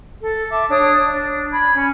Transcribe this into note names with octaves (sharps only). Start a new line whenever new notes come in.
A4
E5 A5 D6
D4 C#5 D#6
D4
B5 G#6
C#4